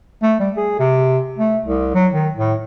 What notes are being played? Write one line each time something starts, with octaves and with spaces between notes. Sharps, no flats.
A3
G3
G#4
C3
A3
C2
F#3
D#3
A2